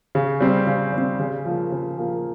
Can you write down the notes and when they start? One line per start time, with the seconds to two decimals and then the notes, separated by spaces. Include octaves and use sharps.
0.15 C#3
0.41 G3 C4
0.67 C#3
0.93 G3
0.98 C4
1.19 C#3
1.45 F3 A#3
1.72 C#3
1.98 F3 A#3